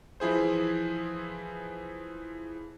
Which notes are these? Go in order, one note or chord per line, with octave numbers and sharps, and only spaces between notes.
E3 F3 E4 G#4 C5